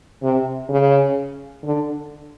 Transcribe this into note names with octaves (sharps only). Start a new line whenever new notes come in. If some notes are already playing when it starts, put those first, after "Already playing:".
C3
C#3
D3